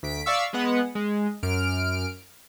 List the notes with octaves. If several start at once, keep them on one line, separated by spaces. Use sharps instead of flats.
D2 B6 D7
D5 E5 F5 C#6 E6
G#3 B3 F#5
G#3
F#2 F6 D7